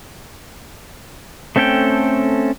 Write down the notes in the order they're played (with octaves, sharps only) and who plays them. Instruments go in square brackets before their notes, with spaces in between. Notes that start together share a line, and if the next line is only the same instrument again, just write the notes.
[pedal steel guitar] A3 C4 C#4 A4 G5